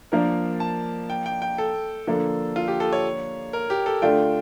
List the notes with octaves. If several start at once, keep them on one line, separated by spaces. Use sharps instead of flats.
F3 A#3 D4 A#4
A5
G5
G5
G5
A4
D3 F3 A#3 D4
F4
G4
A4
C#5
A#4
G4
A4
D3 A3 D4 F4 G5